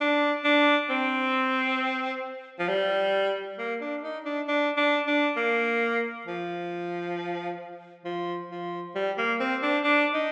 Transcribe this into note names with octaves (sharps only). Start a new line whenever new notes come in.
D4
D4
C4
F3
G3
A#3
D4
D#4
D4
D4
D4
D4
A#3
F3
F3
F3
G3
A#3
C4
D4
D4
D#4